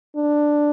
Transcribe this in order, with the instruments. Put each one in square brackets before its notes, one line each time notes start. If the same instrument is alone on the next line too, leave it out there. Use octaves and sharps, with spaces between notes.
[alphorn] D4